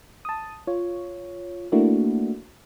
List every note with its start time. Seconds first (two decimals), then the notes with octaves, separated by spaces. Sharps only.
0.25 A5 D#6
0.67 F4 C#5
1.72 A3 A#3 D4 E4 F#4